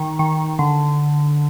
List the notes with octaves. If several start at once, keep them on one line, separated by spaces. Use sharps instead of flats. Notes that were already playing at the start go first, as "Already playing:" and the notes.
Already playing: D#3
D#3
D3